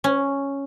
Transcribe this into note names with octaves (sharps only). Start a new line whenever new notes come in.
C#4